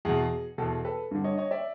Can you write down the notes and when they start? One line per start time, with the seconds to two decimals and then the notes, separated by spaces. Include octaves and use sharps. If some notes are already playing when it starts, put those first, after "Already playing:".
0.05 E2 B2 G#4
0.58 E2 B2 A4
0.85 A4 B4
1.11 G2 D3
1.24 C#5 D#5
1.38 C#5 D#5
1.51 D5 E5